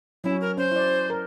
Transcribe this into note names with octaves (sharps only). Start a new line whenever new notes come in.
F#3 C#4 E4
A#4
C#4 C5
E4 D5
A#4